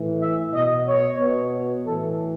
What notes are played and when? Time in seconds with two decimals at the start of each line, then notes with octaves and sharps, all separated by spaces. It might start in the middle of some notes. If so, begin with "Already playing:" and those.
Already playing: A2 E3
0.21 E5
0.54 B2 D#5
0.86 C#5
1.20 B2
1.85 A2 E3 A4